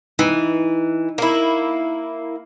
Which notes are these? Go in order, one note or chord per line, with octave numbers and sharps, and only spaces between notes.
E3 D#4
A#3 E4